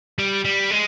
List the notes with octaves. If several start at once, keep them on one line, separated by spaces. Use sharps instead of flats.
G3
G3
G#3